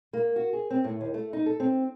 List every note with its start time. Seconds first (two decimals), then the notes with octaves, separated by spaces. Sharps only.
0.13 A#3
0.36 F#4
0.53 G#4
0.70 C4
0.84 A2
1.01 D#2
1.14 A3
1.33 D#4
1.46 A4
1.60 C4